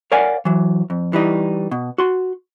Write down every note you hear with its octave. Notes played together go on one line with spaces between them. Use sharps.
A#4 C#5 D5 F5 F#5 G#5
E3 F#3
F2
E3 G3 D#4
B2
F#4 C6